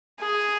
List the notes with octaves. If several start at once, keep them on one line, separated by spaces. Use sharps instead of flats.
G#4